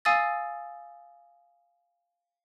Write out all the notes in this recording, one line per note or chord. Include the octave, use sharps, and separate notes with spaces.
F5 G#5 D#6 E6 A6